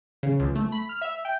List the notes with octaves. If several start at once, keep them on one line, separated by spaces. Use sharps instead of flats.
C#3
C#2
A3
B5
F6
E5
G5